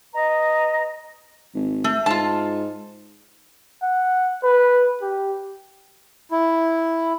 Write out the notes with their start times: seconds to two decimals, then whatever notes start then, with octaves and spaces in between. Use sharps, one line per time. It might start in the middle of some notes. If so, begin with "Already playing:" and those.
0.13 B4 D#5 A#5
1.55 G#1
1.84 A3
2.06 G#2 F4 A5
3.82 F#5
4.43 B4
5.02 G4
6.31 E4